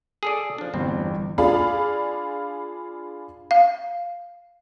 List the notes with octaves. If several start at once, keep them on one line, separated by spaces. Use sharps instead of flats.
G#4 A4 D5
F3 D4
G1 E2 G3 C4
D4 F4 G#4 D5 F5 B5
F5